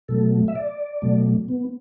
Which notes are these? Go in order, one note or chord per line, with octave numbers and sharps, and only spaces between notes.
B2 F#3 A3 A4
E5
D5
B2 F#3 A3
B3